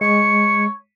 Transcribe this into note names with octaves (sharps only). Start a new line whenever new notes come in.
G#3 C#5 C#7